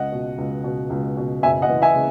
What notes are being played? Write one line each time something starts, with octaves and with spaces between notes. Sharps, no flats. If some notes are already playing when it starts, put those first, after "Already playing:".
Already playing: C#2 D#5 F#5
B2
C#2
B2
C#2
B2
F#1 E5 G#5
D#5 F#5
E3
E5 G#5
C#3